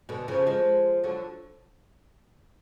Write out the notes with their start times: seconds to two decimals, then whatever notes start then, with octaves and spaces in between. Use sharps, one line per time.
0.09 B2 D3
0.28 C#3 F3
0.47 F3 G#3
1.04 D3 F#3